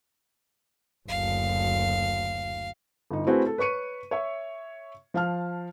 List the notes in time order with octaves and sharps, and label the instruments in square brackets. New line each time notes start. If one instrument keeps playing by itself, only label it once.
[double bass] F#1 D2 [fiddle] F5
[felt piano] G1 D#4
A3 C4 E4 F#4 G#4 B4
A4
B4 C#5 C#6 C#7 D#7
C#5 E5
F3 F5 A5 F6